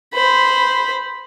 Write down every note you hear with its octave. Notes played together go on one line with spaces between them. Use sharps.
C5 B5